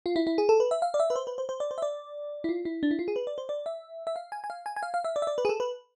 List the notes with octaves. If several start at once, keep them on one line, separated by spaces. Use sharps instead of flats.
F4
E4
E4
G#4
A4
B4
E5
F5
D5
E5
B4
C5
B4
C5
C5
D5
C5
E5
D5
E4
F4
E4
D4
E4
F4
G#4
B4
D5
C5
D5
E5
E5
F5
G#5
G#5
F5
G#5
G#5
F5
F5
E5
D5
E5
D5
B4
G#4
A4
B4